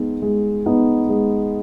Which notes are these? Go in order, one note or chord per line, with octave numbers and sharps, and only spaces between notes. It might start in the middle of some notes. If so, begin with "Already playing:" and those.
Already playing: G#3 B3 D#4
G#3
B3 D#4
G#3